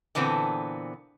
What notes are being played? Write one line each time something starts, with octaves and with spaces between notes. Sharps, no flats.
A#2 D3 E3 B3 C4